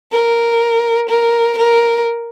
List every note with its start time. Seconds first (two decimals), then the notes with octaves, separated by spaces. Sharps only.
0.12 A#4
1.09 A#4
1.57 A#4